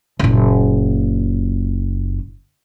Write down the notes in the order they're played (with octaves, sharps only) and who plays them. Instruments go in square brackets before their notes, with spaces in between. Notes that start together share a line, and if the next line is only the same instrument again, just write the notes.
[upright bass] F#1 A#2